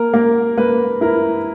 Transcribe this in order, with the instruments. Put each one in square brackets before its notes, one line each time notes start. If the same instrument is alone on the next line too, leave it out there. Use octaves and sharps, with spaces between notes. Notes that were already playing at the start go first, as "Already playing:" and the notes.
Already playing: [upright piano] A#3 [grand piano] A#4
[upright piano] A#3
[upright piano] A#3 [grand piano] B4
[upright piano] E4 [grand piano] A#4